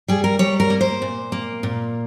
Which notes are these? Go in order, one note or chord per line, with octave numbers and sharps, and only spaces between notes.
G3 G#4
A#4
G3 C#5
A#4
A#3
C5
A#2
A#3
A#2